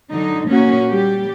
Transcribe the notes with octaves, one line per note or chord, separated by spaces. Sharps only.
D3 F#3 D#4
A#2 A#3 C#4 F#4
G3 G4